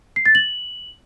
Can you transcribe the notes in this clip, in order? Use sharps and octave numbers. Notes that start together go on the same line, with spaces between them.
C7
A6
F#7